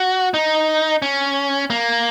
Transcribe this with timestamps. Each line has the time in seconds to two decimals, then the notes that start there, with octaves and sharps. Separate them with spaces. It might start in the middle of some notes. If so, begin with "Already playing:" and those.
Already playing: F#4
0.34 D#4
1.02 C#4
1.70 A#3